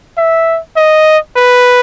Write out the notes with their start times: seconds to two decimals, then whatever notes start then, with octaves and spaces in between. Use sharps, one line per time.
0.17 E5
0.76 D#5
1.36 B4